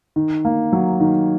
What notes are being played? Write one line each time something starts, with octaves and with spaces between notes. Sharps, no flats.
D#3
A#3
F#3
D#3